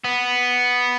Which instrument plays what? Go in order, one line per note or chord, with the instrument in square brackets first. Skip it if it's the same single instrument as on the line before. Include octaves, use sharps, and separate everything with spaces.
[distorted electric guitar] B3